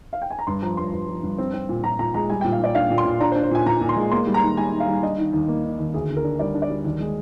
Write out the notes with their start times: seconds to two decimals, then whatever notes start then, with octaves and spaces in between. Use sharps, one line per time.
0.13 F5
0.22 G5
0.30 G#5
0.39 A#5
0.47 G2 C6
0.62 F3 A#5
0.77 G2 C6
0.93 G2
1.08 F3
1.23 G2
1.38 C4
1.54 C4
1.69 A#2
1.84 A#2 A#5
1.99 A#2 A#5
2.14 G#3 A#5
2.30 G3 G#5
2.41 G5
2.44 A#2
2.52 F5
2.60 A#2 D5
2.75 D4 F5
2.90 A#2
2.98 C6
3.05 A#2
3.20 D4 A#5
3.32 C5
3.36 D4
3.43 C5
3.51 A#2 G#5
3.66 A#2 A#5
3.81 A#2
3.89 C6
3.96 G#3
4.11 A#3 C6
4.27 G3
4.34 A#5
4.42 D#3
4.57 G3 G#5
4.72 D#3
4.80 F5
4.88 G3
5.03 D4 D#5
5.18 D#3
5.33 D#2
5.48 A#3
5.64 D#3
5.79 D#2
5.94 D2 G#4
6.09 D3
6.17 A#4
6.24 D4
6.39 G3 D5
6.54 D4
6.62 D5
6.70 G3
6.85 D#2
7.00 G#3